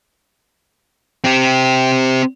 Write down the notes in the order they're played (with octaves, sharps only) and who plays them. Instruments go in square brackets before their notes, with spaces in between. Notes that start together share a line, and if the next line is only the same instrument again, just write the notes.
[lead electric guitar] C4 G4